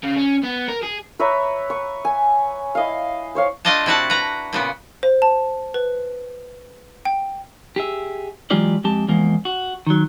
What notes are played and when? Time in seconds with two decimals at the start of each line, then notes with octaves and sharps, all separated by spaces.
0.04 C#3
0.17 C#4
0.43 B3
0.68 A#4
0.83 G#4
1.19 B4 C#5 E5 A#5
1.70 C#6
2.05 G#5
2.75 E4 D#5 F5
3.35 C5 C#5 F5
3.65 A3 D4 F4 D#5 F5 A5
3.86 C3 E4 F#4 A5
4.10 B4 A#5
4.53 A#2 C#3 B3
5.03 C5
5.22 A5
5.74 B4
7.05 G5
7.76 G4 G#4 E5
8.50 E3 F#3 G#3 F4 G4 D5
8.84 F2 G#3 G4 A5
9.08 E2 F3 G#3 A#3
9.45 F#4
9.87 D#3 F#3